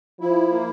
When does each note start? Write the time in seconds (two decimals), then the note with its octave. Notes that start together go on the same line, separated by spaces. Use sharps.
0.20 F3 E4
0.51 A#3